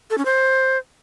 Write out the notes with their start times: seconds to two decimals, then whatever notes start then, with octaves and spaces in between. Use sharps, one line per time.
0.10 A4
0.18 C#4
0.25 C5